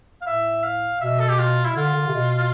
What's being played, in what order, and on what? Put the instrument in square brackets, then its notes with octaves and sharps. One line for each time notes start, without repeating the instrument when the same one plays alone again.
[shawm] F5
[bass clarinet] A2 [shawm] E5
[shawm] F5
[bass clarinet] B2 [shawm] E5
[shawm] A4
G4
F4
E4
[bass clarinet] D3 [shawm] F4
[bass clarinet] D3
C3
B2